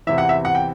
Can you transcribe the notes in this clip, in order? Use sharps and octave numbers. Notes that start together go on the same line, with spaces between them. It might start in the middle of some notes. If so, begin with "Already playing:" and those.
E2 C3 E3 E5
F#5
E5
F#5
G5